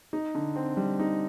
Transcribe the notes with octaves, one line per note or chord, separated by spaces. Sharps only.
D#4
D3
C4
G3
D#4